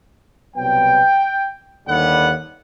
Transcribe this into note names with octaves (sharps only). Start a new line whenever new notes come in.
C2 B2 F#3 B3 G5
D#2 D3 G3 B3 F#5